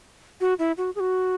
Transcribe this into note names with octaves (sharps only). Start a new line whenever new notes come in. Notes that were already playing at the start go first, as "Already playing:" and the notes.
F#4
E4
F#4
G#4
F#4